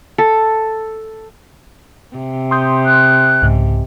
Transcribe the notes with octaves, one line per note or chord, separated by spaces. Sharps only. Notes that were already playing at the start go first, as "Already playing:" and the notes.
A4
C3
C6 D#6 G6
F#6
C2 G#2 C#3